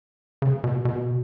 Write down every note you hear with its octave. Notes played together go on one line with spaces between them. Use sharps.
C#3
B2
B2